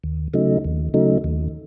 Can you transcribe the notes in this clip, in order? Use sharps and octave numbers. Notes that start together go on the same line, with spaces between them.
D#2
C#3 F#3 A3 D#4
D#2
C#3 F#3 A3 D#4
D#2